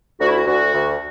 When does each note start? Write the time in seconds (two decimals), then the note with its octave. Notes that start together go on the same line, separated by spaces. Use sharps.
0.20 D2 F#4
0.28 E4
0.36 F#4
0.47 D2 F#4
0.74 D2